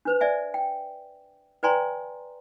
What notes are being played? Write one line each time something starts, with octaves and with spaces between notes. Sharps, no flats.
D4 B4 C5
D5 E5 G#5
G5
B4 D5 G5 G#5 A#5 C6